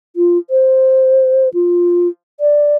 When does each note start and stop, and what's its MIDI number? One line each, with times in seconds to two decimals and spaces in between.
0.16 0.38 65
0.50 1.49 72
1.54 2.08 65
2.40 2.77 74